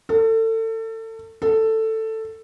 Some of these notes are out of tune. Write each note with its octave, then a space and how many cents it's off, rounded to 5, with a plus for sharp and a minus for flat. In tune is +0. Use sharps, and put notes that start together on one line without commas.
A4 +30
A4 +10